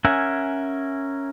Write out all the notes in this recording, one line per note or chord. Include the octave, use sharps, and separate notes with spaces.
C#4 A#4 E5 F#5 G#5